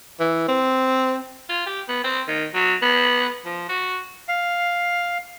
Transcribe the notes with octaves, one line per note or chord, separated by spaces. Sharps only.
E3
C4
F4
G4
B3
C4
D#3
F#3
B3
F3
F#4
F5